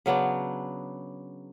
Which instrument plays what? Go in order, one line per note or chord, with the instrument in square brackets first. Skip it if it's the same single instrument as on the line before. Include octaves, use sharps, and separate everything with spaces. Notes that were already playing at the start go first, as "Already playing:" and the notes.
[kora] C#3 F#3 B3 D4